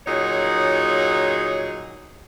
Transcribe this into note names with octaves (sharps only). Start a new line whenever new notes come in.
A#2 F#3 D#4 G#4 C#5